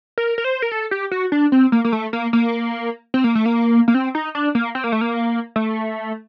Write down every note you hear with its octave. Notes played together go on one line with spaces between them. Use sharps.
A#4
A#4
C5
A#4
A4
G4
F#4
D4
C4
A#3
A#3
A3
A#3
A#3
C4
A#3
A3
A#3
A#3
C4
D#4
D4
A#3
C4
A#3
A3
A#3
A3